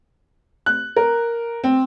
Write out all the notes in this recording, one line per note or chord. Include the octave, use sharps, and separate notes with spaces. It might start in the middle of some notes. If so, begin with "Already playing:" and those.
F#6
A#4
C4